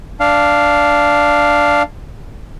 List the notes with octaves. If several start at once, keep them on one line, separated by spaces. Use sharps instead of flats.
D4 F5